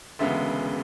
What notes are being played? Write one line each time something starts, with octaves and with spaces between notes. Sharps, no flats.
E1 D2 C#3 G#3 B3 E5